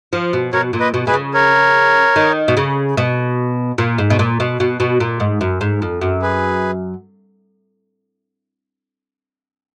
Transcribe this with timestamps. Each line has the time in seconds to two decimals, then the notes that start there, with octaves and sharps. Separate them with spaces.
0.13 F3
0.33 B2
0.53 B2 A#4 C#5
0.73 A#2
0.80 B4 D#5
0.94 B2
1.07 B2 G#4 B4
1.14 C#3
1.34 A#4 C#5
2.16 D#3
2.48 B2
2.57 C#3
2.97 B2
3.78 A#2
3.98 G#2
4.10 B2
4.19 A#2
4.40 B2
4.60 B2
4.80 B2
5.00 A#2
5.20 G#2
5.41 F#2
5.61 G#2
5.82 F2
6.01 F#2
6.22 G#4 B4